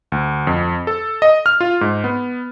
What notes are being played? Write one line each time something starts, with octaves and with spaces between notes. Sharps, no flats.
D2
F2
A4
D#5
F6
F4
G#2
B3